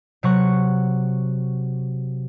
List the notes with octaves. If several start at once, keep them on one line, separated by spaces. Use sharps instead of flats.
C3 F#3 F#5 C#6